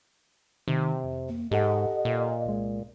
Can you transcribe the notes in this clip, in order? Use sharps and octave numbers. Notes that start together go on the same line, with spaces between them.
C3 D#3
F2
A#3
G#2 G4 A4 D#5 F#5
A#2
C2 G#3